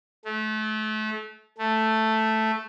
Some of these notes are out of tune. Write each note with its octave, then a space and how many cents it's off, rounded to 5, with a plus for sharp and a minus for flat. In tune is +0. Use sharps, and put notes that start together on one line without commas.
A3 -30
A3 +0